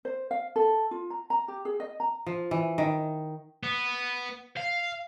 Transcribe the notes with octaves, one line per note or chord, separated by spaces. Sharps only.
C5
F5
A4
F4
A#5
A#5
G4
G#4
D#5
A#5
F3
E3
D#3
B3
F5